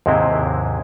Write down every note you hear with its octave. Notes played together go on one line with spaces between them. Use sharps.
D#2 G#2 C3 G#3 C4 E4